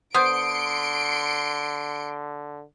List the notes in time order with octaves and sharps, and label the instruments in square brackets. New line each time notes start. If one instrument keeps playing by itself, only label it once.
[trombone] D3 [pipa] B3 C5 [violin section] C6 C#7 D7 [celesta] D#6